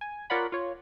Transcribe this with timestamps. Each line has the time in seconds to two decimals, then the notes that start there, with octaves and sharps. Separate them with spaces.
0.01 G#5
0.30 F4 A#4 C#5 D5 F#5 B5
0.52 F4 C#5